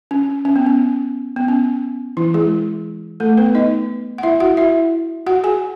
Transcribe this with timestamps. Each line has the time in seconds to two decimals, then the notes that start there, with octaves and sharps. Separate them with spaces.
0.11 C#4
0.45 C#4
0.56 B3
0.66 C#4
1.36 B3
1.48 C#4
2.17 E3 E4
2.34 G#3 G#4
3.20 A3 A4
3.37 B3 B4
3.55 D#4 D#5
4.18 F#5
4.23 E4 E5
4.40 F#4 F#5
4.57 E4 E5
5.26 F#4 F#5
5.44 G#4 G#5